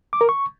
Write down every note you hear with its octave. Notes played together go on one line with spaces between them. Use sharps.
D6
A#4
C#6